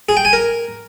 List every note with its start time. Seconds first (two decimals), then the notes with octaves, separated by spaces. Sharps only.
0.09 G#4
0.17 G5
0.25 G#5
0.33 A#4